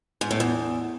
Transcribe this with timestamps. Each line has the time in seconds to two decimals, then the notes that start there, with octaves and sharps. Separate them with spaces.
0.21 G#2
0.31 A2
0.40 E2